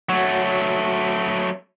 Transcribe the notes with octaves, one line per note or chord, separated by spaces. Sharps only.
F#3 A3 F#4 C#5